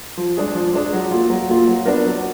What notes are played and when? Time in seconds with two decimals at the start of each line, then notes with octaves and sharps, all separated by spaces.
0.18 F3
0.37 G#3 D4 G#4
0.55 F3
0.73 G#3 D4 G#4
0.93 F#3
1.11 A#3 F4
1.30 F#3
1.49 A#3 F4
1.67 F#3
1.86 B3 D4 F#4 A#4
2.05 F#3